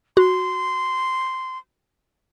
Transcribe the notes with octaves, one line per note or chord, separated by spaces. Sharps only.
F#4 C6